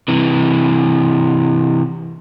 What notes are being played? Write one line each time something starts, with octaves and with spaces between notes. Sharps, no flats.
C3 E3